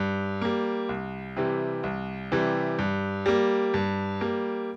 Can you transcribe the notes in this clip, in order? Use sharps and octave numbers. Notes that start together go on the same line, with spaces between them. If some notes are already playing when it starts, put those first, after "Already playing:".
Already playing: G2
G3 A#3
C2
C3 E3 G3
C2
C3 E3 G3
G2
G3 A#3
G2
G3 A#3